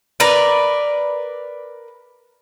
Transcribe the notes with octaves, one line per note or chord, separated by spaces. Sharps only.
A#4 B4 D5